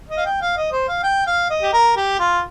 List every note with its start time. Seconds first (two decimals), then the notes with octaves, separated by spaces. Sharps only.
0.10 D#5
0.17 F5
0.25 G5
0.41 F5
0.57 D#5
0.72 C5
0.88 F5
1.03 G5
1.27 F5
1.50 D#5
1.62 G4
1.73 A#4
1.96 G4
2.20 F4